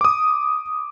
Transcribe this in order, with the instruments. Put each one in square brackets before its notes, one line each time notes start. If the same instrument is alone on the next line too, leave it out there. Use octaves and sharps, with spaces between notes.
[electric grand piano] D6 D#6